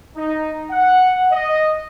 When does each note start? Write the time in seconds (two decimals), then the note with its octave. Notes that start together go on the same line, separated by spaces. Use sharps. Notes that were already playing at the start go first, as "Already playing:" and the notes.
0.17 D#4
0.71 F#5
1.32 D#5